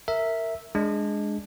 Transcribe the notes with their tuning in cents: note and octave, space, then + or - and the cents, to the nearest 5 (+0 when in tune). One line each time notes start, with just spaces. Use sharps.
A#4 -20 E5 -5
G#3 +0 D4 +0